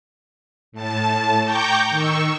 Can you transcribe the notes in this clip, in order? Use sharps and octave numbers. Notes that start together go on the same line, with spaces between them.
A2 A5
G5 A#5 C#6 D6 G6
D#3 C#6 E6